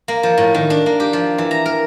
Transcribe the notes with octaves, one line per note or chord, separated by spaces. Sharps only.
A#3
F3
A2
D#3
D4
A#3
G4
F3
E3
A#5
A#4